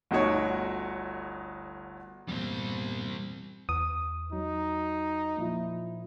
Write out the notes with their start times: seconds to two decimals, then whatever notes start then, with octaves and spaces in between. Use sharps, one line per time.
0.11 G1 D2 D#4 F#4 C#5
2.28 E2 G2 A#2 G3 C4
3.69 E2 D#6
4.32 F#3 D#4
5.36 A#2 F3 E4